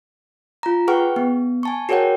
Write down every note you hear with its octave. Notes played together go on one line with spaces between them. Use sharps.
F4 A#5
G#4 B4 F#5 G5 C#6 F6
B3
G#5 A5 C#6
F#4 G#4 A#4 C#5 F#5 G5